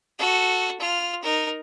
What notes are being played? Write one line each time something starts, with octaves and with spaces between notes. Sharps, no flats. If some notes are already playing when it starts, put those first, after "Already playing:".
F#4 A4
F4 F6
D#4 A#4